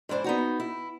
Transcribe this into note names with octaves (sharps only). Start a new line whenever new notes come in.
G#2 E3 D4 C5
B3 D#4 F#4
E4